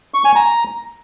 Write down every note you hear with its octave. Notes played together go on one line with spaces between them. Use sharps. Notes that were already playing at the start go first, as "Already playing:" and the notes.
C#6
G#5
A#5